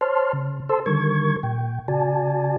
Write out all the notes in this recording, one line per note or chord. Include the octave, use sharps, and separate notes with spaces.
C5 C#5 A5 C6 F6
C#3
A4 C5 A5 C6 E6
D3 D#3 G3 A#4 C#6 G#6
A#2 G5
C#3 F#4 D5 G#5 A5